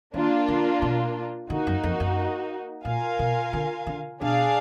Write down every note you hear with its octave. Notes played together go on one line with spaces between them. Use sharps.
D#3 A#3 D4 F4
D3
B2
D3 A#3 D#4 F#4
F#2
F2
F#2
A#2 F4 A#4 F5 G#5
B2
D3
D3
B2 D4 G#4 D5 F5